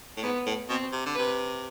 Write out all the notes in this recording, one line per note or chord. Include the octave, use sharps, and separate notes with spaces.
A2
G#2 B3
A2
B2 C4
C3
D3
C3 B4